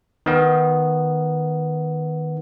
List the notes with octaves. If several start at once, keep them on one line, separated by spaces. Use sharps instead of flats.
D#3 B3